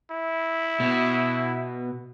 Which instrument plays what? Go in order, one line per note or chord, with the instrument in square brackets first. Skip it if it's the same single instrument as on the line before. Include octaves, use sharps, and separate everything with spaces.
[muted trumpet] E4
[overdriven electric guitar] B2